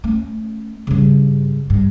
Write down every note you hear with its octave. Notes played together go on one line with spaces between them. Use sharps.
A3 C#4
G2 C#3
G2